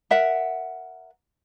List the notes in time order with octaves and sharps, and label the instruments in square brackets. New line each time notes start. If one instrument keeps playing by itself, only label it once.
[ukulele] A#4 E5 F#5